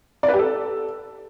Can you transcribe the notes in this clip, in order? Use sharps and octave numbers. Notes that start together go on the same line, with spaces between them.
D5
B4
G4
A4